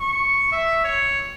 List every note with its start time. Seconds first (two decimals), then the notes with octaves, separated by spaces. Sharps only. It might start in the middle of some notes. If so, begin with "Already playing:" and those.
0.01 C#6
0.52 E5
0.84 C#5